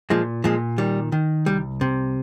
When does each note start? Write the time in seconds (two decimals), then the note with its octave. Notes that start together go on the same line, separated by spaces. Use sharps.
0.10 A#2 F3 G#3
0.44 A#2 F3 G#3
0.78 D#3 G3
1.12 D#3
1.46 C2 G3
1.81 C3